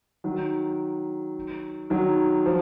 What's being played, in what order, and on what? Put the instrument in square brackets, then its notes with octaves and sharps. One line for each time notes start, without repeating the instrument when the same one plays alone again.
[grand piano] D#3 F#3
D#3 F#3
F3